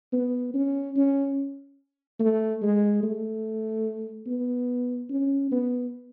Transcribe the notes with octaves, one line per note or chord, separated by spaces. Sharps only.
B3
C#4
C#4
A3
G#3
A3
B3
C#4
B3